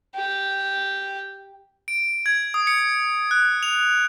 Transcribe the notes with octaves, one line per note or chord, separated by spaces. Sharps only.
G4
D7
G#6
D#6
C#7
F#6
F7